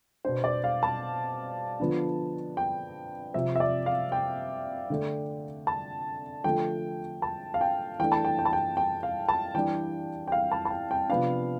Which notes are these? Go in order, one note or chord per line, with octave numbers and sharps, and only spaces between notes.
B2 B3 D4 C5
D5
F5
A5
D3 F3 B3 D4
G5
C3 F3 C4 E5
E5
D5
F5
G5
D3 A3 D4
A5
D3 F3 A3 G5
A5
F5
G5
E3 A3 D4 G5
A5
G5
G5
A5
G5
G5
F5
A5
E3 G3 D4 G5
G5
F5
A5
A5
G5
G5
C3 F3 B3 D4 F5